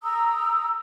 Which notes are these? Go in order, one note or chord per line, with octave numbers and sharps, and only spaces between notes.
A#5 D#6 E6